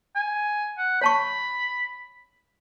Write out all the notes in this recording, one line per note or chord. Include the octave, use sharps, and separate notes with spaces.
G#5
F#5
C#5 A5 B5 C#6